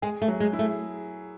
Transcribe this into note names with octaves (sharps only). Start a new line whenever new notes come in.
G#3 G#4
A3
F#3
G#3
E4
A3